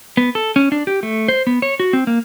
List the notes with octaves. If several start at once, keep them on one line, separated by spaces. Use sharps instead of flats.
B3
A4
C#4
D4
G4
A3
C5
B3
C#5
F#4
C4
A#3